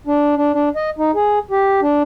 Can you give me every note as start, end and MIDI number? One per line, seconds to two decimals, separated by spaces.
0.07 0.36 62
0.36 0.54 62
0.54 0.69 62
0.76 0.90 75
0.98 1.11 63
1.15 1.39 68
1.51 1.81 67
1.82 2.03 62